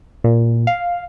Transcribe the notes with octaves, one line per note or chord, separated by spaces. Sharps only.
A#2
F5